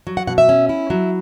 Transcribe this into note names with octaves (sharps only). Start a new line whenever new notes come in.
F#3
F#5
B2 F#5
E5
C#4
E4
F#3